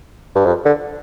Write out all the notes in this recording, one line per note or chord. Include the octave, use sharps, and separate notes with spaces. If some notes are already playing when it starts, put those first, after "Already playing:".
G2
F2
D3